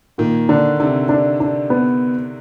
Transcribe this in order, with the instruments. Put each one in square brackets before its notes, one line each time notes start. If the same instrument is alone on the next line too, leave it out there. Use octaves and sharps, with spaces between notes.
[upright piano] A#2 [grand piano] D#3
[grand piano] D3 [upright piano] D4
[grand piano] C3 [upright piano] D4
[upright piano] D4
D4
B3